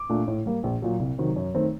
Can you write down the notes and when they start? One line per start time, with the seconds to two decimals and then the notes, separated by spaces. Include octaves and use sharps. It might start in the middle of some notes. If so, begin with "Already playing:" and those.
Already playing: D6
0.09 A#2 A3 D4
0.28 A2
0.46 G3 A#3
0.63 A#1
0.82 A#2 F#3
0.99 C2
1.19 C3 D#3 F#3
1.36 F#2
1.54 D#3 A3 C4